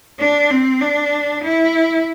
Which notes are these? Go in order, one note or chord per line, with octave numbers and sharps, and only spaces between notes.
D4
C4
D4
E4